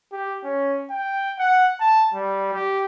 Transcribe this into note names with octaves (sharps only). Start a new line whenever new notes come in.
G4
C#4
G5
F#5
A5
G3
G4